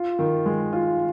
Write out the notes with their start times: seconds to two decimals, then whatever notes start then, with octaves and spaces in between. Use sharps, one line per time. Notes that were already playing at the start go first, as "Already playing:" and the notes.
Already playing: F4
0.19 D#3
0.46 G#3
0.73 F4